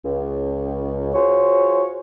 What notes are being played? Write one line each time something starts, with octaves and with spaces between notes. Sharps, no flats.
C#2
F4 F#4 G#4 C5 C#5